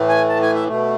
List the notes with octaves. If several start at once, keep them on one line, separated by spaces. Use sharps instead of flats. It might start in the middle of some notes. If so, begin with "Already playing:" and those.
Already playing: A2 E3 A3
G#5
A5
G#5
E5
B2 A3